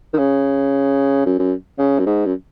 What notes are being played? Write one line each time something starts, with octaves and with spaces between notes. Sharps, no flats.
D#3
C#3
F#2
F#2
C#3
F#2
G#2
F#2